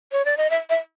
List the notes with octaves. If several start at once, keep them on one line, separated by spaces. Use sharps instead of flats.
C#5
D5
D#5
E5
E5